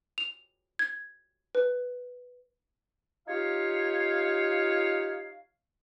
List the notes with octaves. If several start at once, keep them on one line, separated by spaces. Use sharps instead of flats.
F7
G#6
B4
D#4 F4 G4 C#5 F5